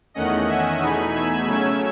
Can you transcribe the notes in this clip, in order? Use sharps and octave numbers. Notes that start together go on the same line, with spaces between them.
E2 D#3 A3 C#4 D#5 F#5
E5 G#5
E2 B2 A3 D#4 G#5 B5
E6 G#6
C#3 F#3 A3 C#4 E6 G#6